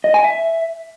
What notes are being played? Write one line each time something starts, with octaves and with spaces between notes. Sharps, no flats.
D#5
G#5
E5